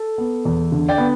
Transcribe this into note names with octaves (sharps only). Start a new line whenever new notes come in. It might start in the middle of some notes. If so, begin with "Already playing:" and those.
Already playing: A4
B3
E2
D3
D5 G5
B3